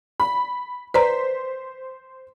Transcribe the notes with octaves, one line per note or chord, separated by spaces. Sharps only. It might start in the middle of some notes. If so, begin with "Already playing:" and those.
B5
B4 C5 D5 A#5 B6